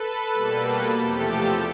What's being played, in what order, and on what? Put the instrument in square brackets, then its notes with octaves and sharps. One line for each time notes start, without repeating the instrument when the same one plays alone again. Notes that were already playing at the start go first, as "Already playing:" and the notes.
Already playing: [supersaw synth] A4 B4
B2 G3 A#3
E2 C3 F3 A3 G4 A4